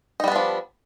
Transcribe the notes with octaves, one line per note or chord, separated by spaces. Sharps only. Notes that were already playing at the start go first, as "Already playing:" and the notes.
F3 G3 B3 D4 D#4